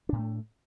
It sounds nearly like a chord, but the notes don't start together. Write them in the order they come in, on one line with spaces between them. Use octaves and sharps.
D4 A2 A#3 A3